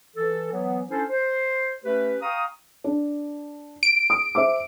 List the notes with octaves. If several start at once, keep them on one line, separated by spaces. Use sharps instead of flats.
E3 A4
E3 F#3 B3
C#4 D4 E4 A4 C5
C5
A3 C#4 G4 B4
F5 G5 A#5 C#6 D#6
D4
D7
D#6
C5 E5 D6